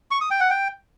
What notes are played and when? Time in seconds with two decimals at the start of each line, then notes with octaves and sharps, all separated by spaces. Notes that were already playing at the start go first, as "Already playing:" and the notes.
0.11 C#6
0.21 D#6
0.31 G5
0.40 F#5
0.50 G5